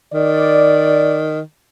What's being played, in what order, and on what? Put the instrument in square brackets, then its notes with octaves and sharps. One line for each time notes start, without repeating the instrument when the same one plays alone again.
[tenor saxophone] D#3 [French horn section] D5